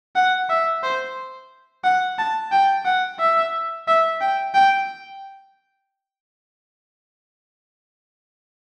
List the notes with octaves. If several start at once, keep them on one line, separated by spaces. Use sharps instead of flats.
F#5
E5
C5
F#5
A5
G5
F#5
E5
E5
G5
G5